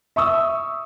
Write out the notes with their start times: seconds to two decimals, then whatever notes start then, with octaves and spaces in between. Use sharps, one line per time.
0.16 E5 C#6 D#6 E6